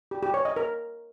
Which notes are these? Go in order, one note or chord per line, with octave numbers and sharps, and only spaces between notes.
G4
G4
C#5
D#5
A#4